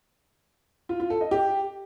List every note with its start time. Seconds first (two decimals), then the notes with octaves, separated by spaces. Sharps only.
0.89 F4
1.00 F4
1.10 A4
1.21 D#5
1.31 G4